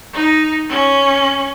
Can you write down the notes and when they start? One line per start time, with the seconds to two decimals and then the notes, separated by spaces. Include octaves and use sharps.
0.14 D#4
0.70 C#4